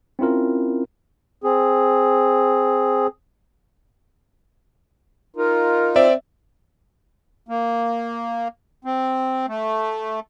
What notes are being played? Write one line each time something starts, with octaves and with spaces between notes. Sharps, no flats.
C4 C#4 E4 F4 A#4
C4 G#4
D#4 F4 A#4
C4 D5 E5
A#3
C4
A3